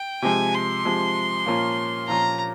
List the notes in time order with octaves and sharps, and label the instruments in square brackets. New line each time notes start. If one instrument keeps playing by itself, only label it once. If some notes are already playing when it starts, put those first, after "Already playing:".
Already playing: [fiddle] G5
[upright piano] C3 F3 G#3 [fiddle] G#5
[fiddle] C6
[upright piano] C3 F3 G#3
A#2 F3 A#3 C#4 F4
[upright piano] A#2 F3 A#3 C#4 F4 [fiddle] A#5